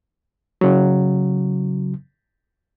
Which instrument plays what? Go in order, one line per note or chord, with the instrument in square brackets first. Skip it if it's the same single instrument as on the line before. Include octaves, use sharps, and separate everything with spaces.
[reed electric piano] C#3 F#3